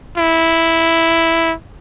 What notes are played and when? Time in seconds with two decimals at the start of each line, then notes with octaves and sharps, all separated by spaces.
0.18 E4